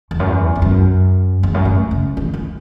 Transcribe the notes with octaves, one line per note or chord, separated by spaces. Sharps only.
E2
F#2
E2
E2
F#2
E2
F#2
A2
C#3
E3
E3